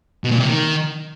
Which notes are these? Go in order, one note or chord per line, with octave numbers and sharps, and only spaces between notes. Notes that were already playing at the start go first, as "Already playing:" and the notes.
B2
A#2
C3
D#3